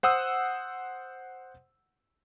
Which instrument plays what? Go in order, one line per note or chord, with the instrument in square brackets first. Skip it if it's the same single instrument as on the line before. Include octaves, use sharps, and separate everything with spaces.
[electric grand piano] C5 F#5 D#6 E6